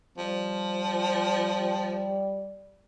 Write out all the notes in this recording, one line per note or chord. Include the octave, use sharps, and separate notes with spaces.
F3 G3